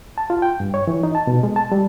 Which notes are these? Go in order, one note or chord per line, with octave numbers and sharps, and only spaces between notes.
A5
F4
G5
G2
C#5
E3
D#4
A5
B2
G#3
A5
G3